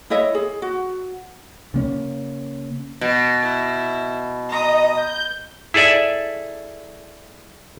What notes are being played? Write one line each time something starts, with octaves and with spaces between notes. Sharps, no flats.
E4 C#5 D#5 E5
G#4
F#4
C#3 A#3 C#4
B2
E4
D#5 A#5 D#6
G6
E4 G#4 A4 D5 E5